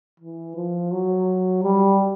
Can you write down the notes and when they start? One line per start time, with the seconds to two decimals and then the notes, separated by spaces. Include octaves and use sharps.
0.20 E3
0.56 F3
0.91 F#3
1.63 G3